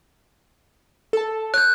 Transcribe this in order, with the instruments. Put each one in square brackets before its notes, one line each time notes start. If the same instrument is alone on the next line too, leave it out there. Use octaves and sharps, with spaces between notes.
[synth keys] A4 A5
[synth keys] C#5 [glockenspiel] F#6 G6